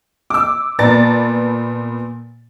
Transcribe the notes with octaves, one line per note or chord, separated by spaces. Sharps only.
D6 E6
A#2 B3 D5 A5 A#5 A6